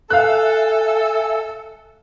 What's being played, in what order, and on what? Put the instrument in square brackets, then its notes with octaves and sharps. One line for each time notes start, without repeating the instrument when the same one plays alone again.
[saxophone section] A4 [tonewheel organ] E5 G#5 E6 [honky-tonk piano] F5 F#6